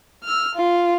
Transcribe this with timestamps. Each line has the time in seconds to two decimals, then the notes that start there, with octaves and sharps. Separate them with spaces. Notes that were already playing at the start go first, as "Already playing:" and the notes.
0.24 E6 F6
0.55 F4